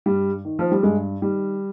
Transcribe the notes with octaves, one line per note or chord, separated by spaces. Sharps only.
G2 G3
D#3
F3
G3
G2 G#3
D#3 G3